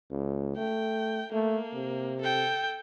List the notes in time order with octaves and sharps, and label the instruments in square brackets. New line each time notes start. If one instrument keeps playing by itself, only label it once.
[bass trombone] C#2
[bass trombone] A3 [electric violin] G5
[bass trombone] A3 [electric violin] A#3
[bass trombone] C3
[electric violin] A4 G5